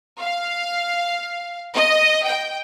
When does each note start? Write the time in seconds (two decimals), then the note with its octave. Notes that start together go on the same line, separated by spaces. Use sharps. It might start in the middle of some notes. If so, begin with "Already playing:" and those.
0.21 F5
1.76 D#5
2.26 G5